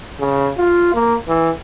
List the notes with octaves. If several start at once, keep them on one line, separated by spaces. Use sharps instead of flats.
C#3
F4
A#3
E3